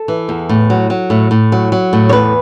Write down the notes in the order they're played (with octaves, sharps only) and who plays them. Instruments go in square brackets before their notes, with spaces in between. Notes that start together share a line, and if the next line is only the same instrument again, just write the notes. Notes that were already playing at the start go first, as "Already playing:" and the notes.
Already playing: [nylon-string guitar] A4
E3
E2
A2
F#3
F#3
A2
A2
F#3
F#3
A2
C#5
E2 B4